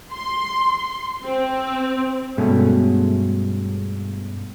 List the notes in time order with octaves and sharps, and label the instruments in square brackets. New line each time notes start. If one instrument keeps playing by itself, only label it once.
[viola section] C6
C4
[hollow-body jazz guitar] G2 B2 G#3 A3 C#4